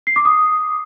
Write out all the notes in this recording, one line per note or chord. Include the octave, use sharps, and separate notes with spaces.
C7
D6
D#6